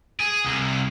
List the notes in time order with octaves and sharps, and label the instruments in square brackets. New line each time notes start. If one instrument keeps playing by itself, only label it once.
[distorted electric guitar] G#4
C2